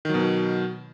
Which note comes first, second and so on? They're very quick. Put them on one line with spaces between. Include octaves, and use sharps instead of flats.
D#3 F#3 B2